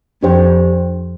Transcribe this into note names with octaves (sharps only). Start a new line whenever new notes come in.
F2 D4 G4 C5 G5